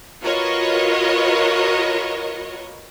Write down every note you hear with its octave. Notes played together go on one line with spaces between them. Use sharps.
F4 F#4 A#4 B4 C#5 D#5